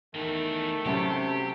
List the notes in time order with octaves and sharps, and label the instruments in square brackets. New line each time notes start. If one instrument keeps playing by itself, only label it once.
[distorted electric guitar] E2 E3 [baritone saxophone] D#3 [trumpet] A3
[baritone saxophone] C3 [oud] F#3 C#4 E4 [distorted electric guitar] G4